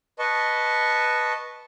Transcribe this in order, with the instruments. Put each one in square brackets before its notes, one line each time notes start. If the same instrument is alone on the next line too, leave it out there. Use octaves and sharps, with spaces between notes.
[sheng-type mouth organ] B4 D#5 A5 C#6